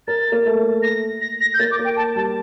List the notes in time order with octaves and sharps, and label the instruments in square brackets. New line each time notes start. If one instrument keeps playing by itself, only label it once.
[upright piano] A#4 [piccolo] A6
[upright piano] A#3
A3
[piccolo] A#6
A#6
A#6
G6
[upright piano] A#3 [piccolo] A6
[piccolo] D6
[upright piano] A#3
[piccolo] G5
A5
[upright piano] G3 [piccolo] A5